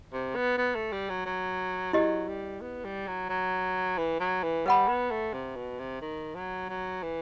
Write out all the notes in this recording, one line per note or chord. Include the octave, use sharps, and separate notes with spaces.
C3
B3
B3
A3
G3
F#3
F#3
F#3 E4 G4 D#5
G3
B3
G3
F#3
F#3
E3
F#3
E3
G3 B4 F#5 B5
B3
A3
C3
B2
C3
D#3
F#3
F#3
E3